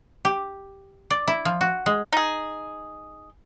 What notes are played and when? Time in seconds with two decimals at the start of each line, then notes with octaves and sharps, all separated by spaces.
0.25 G4
1.10 D5
1.28 E4
1.45 F3
1.61 F#4
1.86 G#3
2.12 D#4 G#4